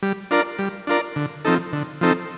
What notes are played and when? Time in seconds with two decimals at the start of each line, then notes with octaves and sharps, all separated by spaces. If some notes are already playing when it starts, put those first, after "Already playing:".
0.03 G3
0.31 D4 F4 A#4 D5
0.59 G3
0.87 D4 F4 A#4 D5
1.16 D3
1.45 F3 C4 D#4 A4
1.73 D3
2.01 F3 C4 D#4 A4